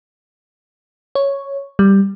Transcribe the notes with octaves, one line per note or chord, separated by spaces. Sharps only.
C#5
G3